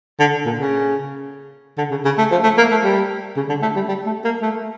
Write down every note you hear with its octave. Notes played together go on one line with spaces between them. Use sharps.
D3
A#2
C#3
D3
C#3
C#3
A3
F3
A3
A#3
A3
G3
C#3
D3
A3
G3
G3
A3
A#3
A3